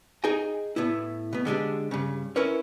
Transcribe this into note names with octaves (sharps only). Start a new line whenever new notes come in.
D#4 G#4 D#5 G5 G#5
A2 B3 E4
B2 B3
D3 G#3 D4 G4
G2 C#3
C#4 E4 A#4 B4 C#5